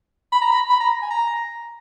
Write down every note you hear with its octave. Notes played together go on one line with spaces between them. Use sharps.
B5
A#5
B5
B5
A#5
G#5
A#5